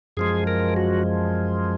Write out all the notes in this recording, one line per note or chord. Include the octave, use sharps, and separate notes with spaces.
F#2 F3 G#3 G#4
A#4
F#4